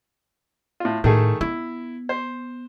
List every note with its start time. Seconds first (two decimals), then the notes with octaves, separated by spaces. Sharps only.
0.80 A2 F4
1.04 A2 D#3 A3 G#4
1.41 B3 E4
2.09 C5